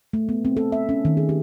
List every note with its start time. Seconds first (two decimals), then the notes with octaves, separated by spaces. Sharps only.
0.13 A3
0.29 B3
0.45 C4
0.57 A4
0.72 E5
0.89 C#4
1.05 D#3
1.17 G#4
1.29 G4